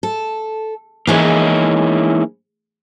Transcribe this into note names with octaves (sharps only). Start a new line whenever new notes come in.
A4
E3 G#3 A#3 C#4 D#4 E4